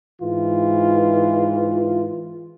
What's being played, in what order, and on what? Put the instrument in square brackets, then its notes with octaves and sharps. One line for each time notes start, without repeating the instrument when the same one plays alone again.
[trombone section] G#2 E3 F4